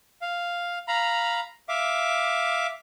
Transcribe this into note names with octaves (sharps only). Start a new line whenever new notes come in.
F5
F5 A#5 B5
E5 F5 D6